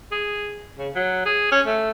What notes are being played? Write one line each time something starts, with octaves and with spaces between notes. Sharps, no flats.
G#4
C#3
F#3
G#4
C#4
A3